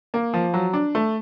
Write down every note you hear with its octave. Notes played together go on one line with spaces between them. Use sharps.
A#3
F3
F#3
D4
A3